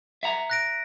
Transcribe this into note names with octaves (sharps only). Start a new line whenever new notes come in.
E5 F#5 A#5
F#6 A#6 D7